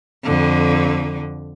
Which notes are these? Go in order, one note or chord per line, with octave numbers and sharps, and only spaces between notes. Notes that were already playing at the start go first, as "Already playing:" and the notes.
F2 D3